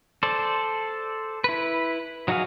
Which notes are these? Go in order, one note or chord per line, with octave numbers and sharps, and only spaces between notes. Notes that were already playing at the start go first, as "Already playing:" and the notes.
A4 C5 D5
E4 B4
F#3 D#4 F#4 G#4 F5